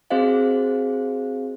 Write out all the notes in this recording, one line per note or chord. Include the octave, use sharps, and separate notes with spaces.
C4 F#4 G#4 C5 D#5 F5